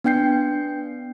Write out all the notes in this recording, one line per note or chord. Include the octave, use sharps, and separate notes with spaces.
B3 D4 G5 G6 C7